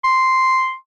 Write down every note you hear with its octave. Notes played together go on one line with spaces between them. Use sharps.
C6